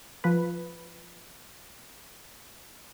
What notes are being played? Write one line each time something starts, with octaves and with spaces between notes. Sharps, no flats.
F3 B4